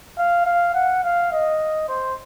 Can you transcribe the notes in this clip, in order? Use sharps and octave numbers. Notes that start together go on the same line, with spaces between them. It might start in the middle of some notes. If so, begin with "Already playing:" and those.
F5
F5
F#5
F5
D#5
C5